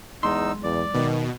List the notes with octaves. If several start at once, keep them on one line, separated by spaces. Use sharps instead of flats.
B1 E2 G#3 D#4 C6 E6
E2 D5
B2 D#3